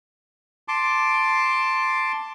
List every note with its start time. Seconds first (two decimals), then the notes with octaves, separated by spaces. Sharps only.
0.68 A5 C6 D6